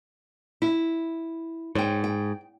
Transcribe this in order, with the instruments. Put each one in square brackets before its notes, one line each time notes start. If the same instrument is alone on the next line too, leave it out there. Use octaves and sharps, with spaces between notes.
[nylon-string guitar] E4
[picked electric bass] G#2 [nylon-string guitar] C#5 G5
[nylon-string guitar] G5